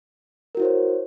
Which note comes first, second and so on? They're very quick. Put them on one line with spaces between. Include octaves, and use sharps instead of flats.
A#4 F#4 E4 C5 C#5